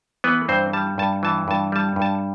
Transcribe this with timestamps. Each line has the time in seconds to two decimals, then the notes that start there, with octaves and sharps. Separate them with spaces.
0.24 E3 B3 B4
0.49 G2 C4 C5
0.73 G3 A5
0.98 G2 A5
1.23 E3 A5
1.48 G2 A5
1.72 G3 A5
1.96 G2
2.02 A5